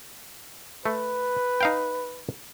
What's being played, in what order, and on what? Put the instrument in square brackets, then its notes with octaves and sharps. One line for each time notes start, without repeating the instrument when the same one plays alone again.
[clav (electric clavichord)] A3 [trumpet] B4
[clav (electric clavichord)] D#4 F5 G5